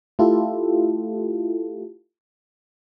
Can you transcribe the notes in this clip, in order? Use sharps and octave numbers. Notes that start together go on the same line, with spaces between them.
A3 E4 F4 G4 A4